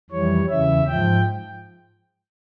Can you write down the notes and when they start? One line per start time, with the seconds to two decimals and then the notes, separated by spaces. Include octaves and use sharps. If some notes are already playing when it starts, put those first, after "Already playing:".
0.10 F2 E3 G3 C#5
0.49 E2 C#3 E3 E5
0.87 G#2 F3 G5